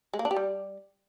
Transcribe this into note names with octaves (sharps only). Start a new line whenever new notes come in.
G#3
A#3
D4
G4
G3